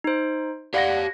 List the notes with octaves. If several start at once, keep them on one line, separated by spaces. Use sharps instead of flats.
D#4 C5
G4 D5 F5 F#5 G#6 A#6